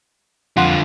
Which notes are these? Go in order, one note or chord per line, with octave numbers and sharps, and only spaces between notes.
F2 D3 F4 F#5 C6